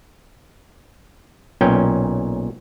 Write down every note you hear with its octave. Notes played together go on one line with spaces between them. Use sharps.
B1 A#2 C#4 G5